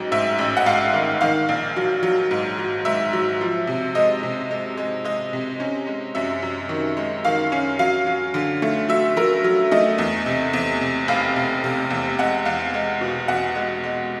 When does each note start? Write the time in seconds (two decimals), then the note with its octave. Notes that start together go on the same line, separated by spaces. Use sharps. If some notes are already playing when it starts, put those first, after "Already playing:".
Already playing: A1 G#2 F#3
0.12 G#2 E5
0.39 A1
0.57 F#5
0.66 G#2 F5
0.94 D#3
1.21 D#3 F5
1.49 A#1
1.76 F#3
2.03 F#3
2.31 G#2
2.59 F#3
2.85 G#2 E5
3.13 F#3
3.41 F3
3.67 C3
3.95 G#3 D#5
4.23 C3
4.51 G#3
4.77 G#3
5.04 G#3 D#5
5.33 C3
5.60 C#4
5.87 G#3
6.15 F#2 E5
6.42 F#2
6.69 D#3
6.97 G#3
7.25 D#3 F5
7.52 C#4
7.79 F#3 F5
8.07 F#3
8.34 D3
8.62 A3
8.89 F#3 E5
9.17 F#3 A#4
9.44 F#3
9.72 A3 D#5
9.98 E2
10.26 C3
10.53 E2
10.81 C3
11.08 F1 F5
11.36 C3
11.64 C3
11.90 E2
12.19 G#3 F#5
12.45 E2 F5
12.74 G#3
13.01 B2
13.28 E2 F#5
13.55 G#3
13.84 G#3